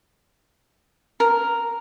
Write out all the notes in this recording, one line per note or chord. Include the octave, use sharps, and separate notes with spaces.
A#4